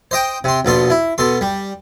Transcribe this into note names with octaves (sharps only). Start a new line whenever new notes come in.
C5 D#5 G5
C3 C6
A#1 B2 A4 C6
E4
B2 A4 C6
G3